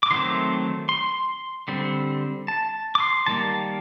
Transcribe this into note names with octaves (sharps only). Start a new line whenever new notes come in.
D6
D#3 F#3 A3 C4 C6
C6
D3 G3 C4
A5
D6
C6
D#3 G3 A#3 A5